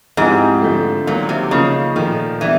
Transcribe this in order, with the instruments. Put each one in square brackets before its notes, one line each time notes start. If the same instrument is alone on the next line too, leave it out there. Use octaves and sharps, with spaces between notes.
[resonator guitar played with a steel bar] G#2 [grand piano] F3 G#3 C4 E4 G4
[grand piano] D3 F3 A3
[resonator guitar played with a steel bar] A#2 [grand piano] D#3 F#3 A#3
[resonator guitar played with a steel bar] C3
[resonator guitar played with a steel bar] C#3 [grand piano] F3 A#3 D#4
[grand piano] A#2 F3 A3 [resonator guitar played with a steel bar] D#3
[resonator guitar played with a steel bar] E3 [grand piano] G3 B3 D4